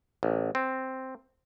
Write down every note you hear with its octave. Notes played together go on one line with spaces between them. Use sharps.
A1
C4